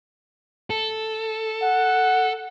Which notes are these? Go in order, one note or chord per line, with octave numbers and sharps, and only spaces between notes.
A4
F#5